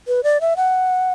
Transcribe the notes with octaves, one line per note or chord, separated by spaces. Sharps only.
B4
D5
E5
F#5